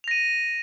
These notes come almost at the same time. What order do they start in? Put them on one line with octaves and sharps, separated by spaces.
F7 A#6 D#7